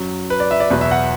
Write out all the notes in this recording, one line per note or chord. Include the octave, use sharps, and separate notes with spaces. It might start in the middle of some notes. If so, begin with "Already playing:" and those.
Already playing: F#2 F#3
B4
D5
E5
D5
E2 B2 F#3 B4
E5
F#5